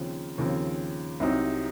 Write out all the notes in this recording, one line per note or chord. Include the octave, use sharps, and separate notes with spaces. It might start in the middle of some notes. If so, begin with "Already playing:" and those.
Already playing: D#2 C#3 F3 C4
D#2 C#3 F3 C4
C2 C3 F#3 C4 D#4